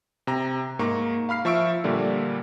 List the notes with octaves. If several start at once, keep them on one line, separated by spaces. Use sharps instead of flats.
C3 A#5
G#2 A#3 A#5 C#6
F5 B5 F6 C7
F3 E5 C#6 E6 D7
A#2 D3 G3 A#3